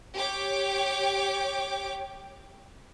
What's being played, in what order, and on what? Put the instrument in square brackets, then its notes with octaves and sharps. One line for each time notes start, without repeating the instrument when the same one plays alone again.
[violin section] G4 C#5 G5 D6